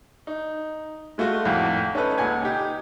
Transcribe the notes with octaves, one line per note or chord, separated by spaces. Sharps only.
D#4
G#3 A3 F4 F#4
G#1 F2 A2 F4 F#5
C#4 D#4 A4 B4
C#2 A#2 F#5 G#5 G#6
D#4 G4